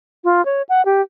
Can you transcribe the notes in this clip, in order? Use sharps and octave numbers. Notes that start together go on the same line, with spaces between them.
F4
C#5
F#5
G4